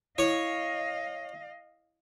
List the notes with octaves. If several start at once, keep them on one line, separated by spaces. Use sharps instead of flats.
E4 C#5 D#5 F5